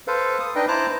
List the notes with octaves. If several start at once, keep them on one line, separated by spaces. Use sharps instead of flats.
A4 B4 C5 F5
D#6
D4 D#4 B4 D#5 G5
E4 C5 A5 A#5 D6 F#6